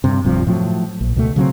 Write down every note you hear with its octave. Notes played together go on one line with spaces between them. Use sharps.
G2 C3
D1 G2 C3 F3
A2 F3 F#3
A#1
C#2 B2 A3
C#3 F#3 B3 C4